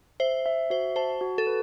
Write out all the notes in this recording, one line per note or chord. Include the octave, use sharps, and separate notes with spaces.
C5 E5
E5
F#4 C5
C5 A5
F#4
A4
B4